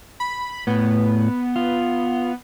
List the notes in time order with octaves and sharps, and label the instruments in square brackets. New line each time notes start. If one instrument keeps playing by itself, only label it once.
[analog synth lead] B5
[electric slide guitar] A2 [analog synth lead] B3
[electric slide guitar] F4